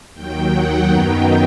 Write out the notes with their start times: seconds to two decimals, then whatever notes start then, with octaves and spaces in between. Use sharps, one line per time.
0.13 D#2 D#3 F#3 G5
0.51 F#5
0.88 F#2 D#3 F#3 B3 D#4 G5